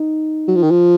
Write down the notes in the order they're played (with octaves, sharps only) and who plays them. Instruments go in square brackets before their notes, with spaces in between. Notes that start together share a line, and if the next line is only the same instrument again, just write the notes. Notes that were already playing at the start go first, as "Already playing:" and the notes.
Already playing: [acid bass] D#4
[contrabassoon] F#3
F3
D#3
F3